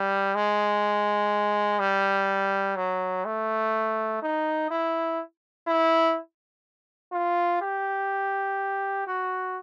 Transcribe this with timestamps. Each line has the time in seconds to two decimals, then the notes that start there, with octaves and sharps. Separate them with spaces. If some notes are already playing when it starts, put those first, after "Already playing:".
Already playing: G3
0.35 G#3
1.80 G3
2.76 F#3
3.25 A3
4.23 D#4
4.71 E4
5.68 E4
7.13 F4
7.62 G4
9.07 F#4